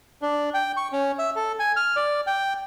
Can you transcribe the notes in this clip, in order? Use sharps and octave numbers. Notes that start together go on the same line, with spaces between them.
D4
G5
C#6
C#4
E5
A4
G#5
F6
D5
G5